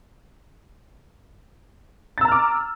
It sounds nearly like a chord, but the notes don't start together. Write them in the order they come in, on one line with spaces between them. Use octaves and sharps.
A6 E6 A#5 F6 D6